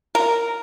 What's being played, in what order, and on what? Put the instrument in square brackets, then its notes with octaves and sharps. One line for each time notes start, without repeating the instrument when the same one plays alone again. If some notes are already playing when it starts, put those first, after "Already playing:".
[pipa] A#4